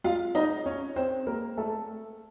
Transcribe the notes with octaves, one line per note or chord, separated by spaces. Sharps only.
F4 F5
D#4 D#5
C#4 C#5
C4 C5
A#3 A#4
A3 A4